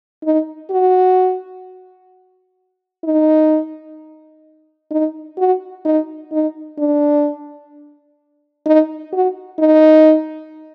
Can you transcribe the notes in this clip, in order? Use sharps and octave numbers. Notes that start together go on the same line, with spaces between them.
D#4
F#4
D#4
D#4
F#4
D#4
D#4
D4
D#4
F#4
D#4